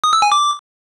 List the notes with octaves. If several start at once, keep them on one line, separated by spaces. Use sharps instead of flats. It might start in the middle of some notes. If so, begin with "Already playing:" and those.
D#6
E6
G#5
D6